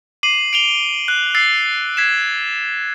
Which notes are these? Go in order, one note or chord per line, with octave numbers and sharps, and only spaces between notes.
D6 C7 D#7 F#7
D7 F7 G7
F#6
E6 A6 C7
G#6 B6 C7 E7